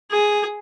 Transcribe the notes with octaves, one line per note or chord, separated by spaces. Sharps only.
G#4